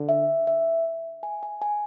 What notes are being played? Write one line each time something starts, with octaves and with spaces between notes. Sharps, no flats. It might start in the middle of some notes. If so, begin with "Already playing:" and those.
Already playing: D3
E5
E5
G#5
G#5
G#5